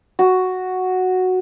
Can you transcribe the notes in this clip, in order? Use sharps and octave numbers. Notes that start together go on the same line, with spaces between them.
F#4